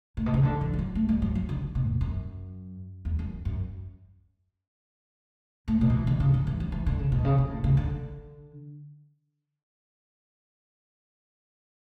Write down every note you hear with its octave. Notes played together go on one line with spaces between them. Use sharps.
A2
B2
C#3
D3
E3
E3
F#3
A3
G3
F#3
F#3
D3
B2
E2
F#2
E2
F#2
F#2
A2
B2
F#3
E3
D3
C#3
D3
E3
F#3
E3
D3
C#3
B2
C#3
D3
A2
C#3
D3